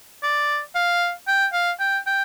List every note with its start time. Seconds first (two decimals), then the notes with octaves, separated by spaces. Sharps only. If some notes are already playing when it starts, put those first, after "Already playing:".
0.23 D5
0.75 F5
1.28 G5
1.53 F5
1.80 G5
2.07 G5